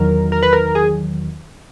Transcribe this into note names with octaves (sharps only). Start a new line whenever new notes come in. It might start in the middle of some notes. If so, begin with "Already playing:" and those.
Already playing: E2 D#3 F#3 A#4
A#4
B4
A#4
G#4